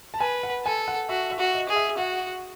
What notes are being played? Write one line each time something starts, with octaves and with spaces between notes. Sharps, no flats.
A5
B4 G#5
F#5
A4 G#5
F#5
F#4 E5
E5
F#4
D#5
G#4
E5
F#4 F#5